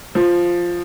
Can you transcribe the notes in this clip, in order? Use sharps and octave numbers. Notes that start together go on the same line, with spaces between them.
F3